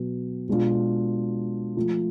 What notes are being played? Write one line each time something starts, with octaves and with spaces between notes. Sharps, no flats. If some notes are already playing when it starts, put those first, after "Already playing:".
Already playing: B2 F#3 B3 F#4
B2 G#3 D4 F4
F3 A3 F4